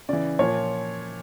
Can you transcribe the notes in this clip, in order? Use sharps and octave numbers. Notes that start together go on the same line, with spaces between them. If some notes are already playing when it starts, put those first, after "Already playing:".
C#3 E3 D5
A#2 F3 C#5